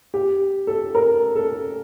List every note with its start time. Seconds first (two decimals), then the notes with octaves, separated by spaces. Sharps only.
0.14 G4
0.67 A4
0.95 A#4
1.35 A4